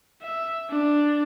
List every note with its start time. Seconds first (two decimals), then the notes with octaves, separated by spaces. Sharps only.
0.22 E5
0.69 D4